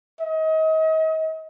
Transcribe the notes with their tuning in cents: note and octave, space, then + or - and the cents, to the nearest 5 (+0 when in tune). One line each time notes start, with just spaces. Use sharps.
D#5 +35